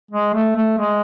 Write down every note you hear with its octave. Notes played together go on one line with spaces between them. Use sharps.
G#3
A3
A3
G#3